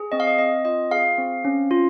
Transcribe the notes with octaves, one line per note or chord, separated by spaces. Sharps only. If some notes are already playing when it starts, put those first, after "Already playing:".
Already playing: G#4
C4 D#5
F5
D#5
C4 D#5
F4 D#5
G#4 F5
C4
C#4
F4